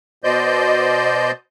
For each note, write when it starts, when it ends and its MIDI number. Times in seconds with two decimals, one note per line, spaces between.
0.24 1.31 47
0.24 1.31 72
0.24 1.31 74
0.24 1.31 75
0.24 1.31 91